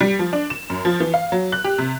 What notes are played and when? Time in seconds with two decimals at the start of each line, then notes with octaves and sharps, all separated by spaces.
0.01 G3
0.19 F3
0.33 D4
0.50 E7
0.70 F#2
0.85 F3
1.00 E3
1.14 F5
1.32 F#3
1.52 F#6
1.64 G4
1.78 C3